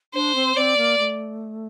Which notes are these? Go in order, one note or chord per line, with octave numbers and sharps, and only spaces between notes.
D4 C5
C4
C4 D5
A#3
A3